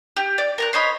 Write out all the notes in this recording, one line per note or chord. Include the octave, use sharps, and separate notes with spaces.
G4
D5
A#4 A#5 F#6
C5 C#5 D#5 B5